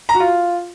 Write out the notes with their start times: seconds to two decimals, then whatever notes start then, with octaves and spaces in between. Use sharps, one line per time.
0.09 A#5
0.14 F#4
0.20 F4